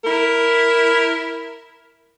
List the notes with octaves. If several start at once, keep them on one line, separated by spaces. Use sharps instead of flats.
E4 A#4